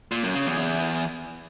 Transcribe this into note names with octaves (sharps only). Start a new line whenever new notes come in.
A#2
F#2
C#3
E2
E2